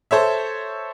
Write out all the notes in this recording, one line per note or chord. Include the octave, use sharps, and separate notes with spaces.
A4 C5 C#5 E5